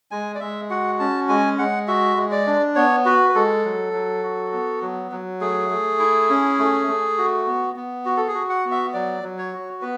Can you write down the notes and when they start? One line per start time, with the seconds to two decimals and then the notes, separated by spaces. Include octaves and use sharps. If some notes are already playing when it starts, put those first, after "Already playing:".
0.11 G#3 G#5
0.35 D5
0.40 G#3 E5
0.70 F#4 F#5
1.00 C#4 A5
1.29 G#3 G#5
1.59 G#3 F#5
1.88 F#4 E5
2.17 G#3
2.32 D5
2.47 D4
2.76 B3 C#5
3.05 F#4 B4
3.29 B4
3.35 G#3 A4
3.64 F#3
3.93 F#3
4.23 F#4
4.53 B3
4.82 F#3
5.11 F#3
5.41 A3 G#4
5.70 A3
5.99 E4
6.30 C#4
6.59 A3
6.88 A3
7.18 F#4
7.47 B3
7.76 B3
8.05 F#4
8.17 A4
8.28 G#4
8.35 F#4
8.50 F#5
8.65 B3
8.71 E5
8.94 F#3 D5
9.23 F#3
9.38 C#5
9.53 F#4
9.82 B3 B4